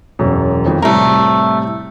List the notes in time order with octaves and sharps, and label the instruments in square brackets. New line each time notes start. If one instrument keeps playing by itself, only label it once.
[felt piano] E1 F#2
F2 D#3
[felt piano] A2 C3 G3 [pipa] A3 A#4